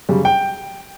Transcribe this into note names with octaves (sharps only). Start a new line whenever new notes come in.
F#2 C#3 G3
G5